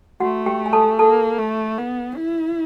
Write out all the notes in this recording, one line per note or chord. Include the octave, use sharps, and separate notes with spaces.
A3 F#4 F#5
G4 G5
G#5
A4 A5
A#3 A4 A5
A3
B3
E4